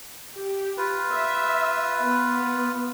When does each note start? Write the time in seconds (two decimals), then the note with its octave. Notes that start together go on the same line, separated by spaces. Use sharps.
0.35 G4
0.77 F4 B4
1.11 E5
2.02 B3